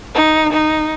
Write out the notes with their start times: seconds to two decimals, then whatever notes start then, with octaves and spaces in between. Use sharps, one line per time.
0.15 D#4
0.53 D#4